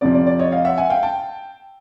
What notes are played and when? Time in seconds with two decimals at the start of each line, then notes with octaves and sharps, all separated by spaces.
0.01 F2 C3 F3 D5
0.15 D5
0.27 D5
0.39 C#5 D#5
0.52 D#5 F5
0.65 E5 F#5
0.78 F#5 G#5
0.90 F5 G5
1.03 G5 A5